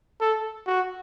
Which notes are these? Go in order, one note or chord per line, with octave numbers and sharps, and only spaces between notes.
A4
F#4